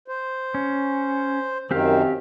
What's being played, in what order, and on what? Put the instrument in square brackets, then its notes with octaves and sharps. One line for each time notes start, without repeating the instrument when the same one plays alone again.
[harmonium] C5
[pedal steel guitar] C#4
[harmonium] F#2 D#3 [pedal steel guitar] C4 G4 F5